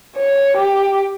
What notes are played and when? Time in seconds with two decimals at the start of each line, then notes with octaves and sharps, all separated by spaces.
0.17 C#5
0.57 G4